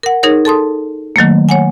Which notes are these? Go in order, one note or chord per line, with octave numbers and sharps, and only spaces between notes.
A#4 F#5
D#4 G#4 A#4 C#5
A4 A5 C6 D#6
D#3 F#3 A3 A#3
C#5 F#5 G#5